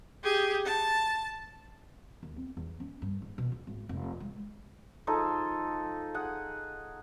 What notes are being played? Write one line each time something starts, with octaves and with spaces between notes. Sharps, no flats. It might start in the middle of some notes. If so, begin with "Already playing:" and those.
G4 G#4
A5
D#2
C4
E2
C#4
G2
G#2
B2
F#1
G#1
F1
G#3
F3 D#4 G#4 A4
G#4 F#5